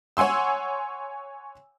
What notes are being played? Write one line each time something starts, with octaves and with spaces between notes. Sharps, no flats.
C#5 F#5 G#5 C6 E6